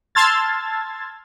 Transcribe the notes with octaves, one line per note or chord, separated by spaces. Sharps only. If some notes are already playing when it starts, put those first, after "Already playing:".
A5 C6 E6 F6 G#6 A6